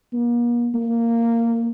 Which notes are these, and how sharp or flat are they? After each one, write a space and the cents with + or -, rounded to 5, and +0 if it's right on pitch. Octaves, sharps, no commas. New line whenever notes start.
A#3 +40
A#3 -10